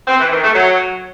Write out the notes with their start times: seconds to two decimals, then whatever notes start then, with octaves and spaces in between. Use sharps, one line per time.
0.07 C4
0.19 E3
0.31 D#3
0.42 A3
0.54 F#3